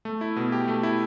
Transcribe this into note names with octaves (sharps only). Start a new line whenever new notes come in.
A3
E4
B2
G4
A3
E4